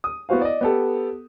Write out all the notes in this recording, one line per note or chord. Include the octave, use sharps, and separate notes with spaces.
D#6
B3 E4 F#4 C5 F5
D5 D#5
B3 G4 A4